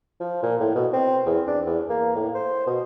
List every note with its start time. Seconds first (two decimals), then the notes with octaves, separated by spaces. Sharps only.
0.20 F3
0.43 A#2
0.60 A2
0.75 B2
0.93 C4
1.26 E2
1.48 D4
1.66 E2
1.90 A#3
2.16 A2
2.34 C5
2.67 B2